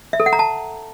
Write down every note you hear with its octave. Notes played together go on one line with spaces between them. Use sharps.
E5
A4
F#5
A#5
A5